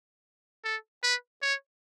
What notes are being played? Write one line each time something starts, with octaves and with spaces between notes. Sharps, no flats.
A4
B4
C#5